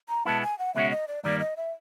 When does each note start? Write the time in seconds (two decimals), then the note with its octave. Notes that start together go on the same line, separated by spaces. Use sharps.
0.09 A#5
0.25 B2 G#3 B3 E4 A5
0.42 G#5
0.59 F#5
0.75 C#2 B2 G#3 C#4 F#4 E5
0.91 D#5
1.08 D5
1.23 G2 D#3 G3 A#3 D5
1.40 D#5
1.57 E5